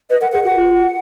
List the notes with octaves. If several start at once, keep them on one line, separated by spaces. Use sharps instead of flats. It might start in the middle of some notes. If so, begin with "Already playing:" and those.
B4 D#5
A#4 F#5
G#4 F#5
F#4 F#5
F4